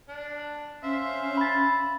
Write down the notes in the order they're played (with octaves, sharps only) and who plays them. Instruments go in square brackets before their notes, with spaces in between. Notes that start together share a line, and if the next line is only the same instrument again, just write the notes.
[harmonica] D4
[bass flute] C#4 [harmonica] C5 E5 F5
[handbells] B5 A6